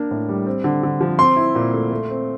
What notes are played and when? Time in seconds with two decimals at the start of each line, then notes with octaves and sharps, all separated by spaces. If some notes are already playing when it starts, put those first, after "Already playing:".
Already playing: A#3 D4
0.11 A2
0.29 G3
0.46 C4
0.64 D3
0.83 D3
1.01 F3
1.19 C4 C6
1.36 E4
1.55 A#2
1.74 A3
1.91 A3
2.10 C4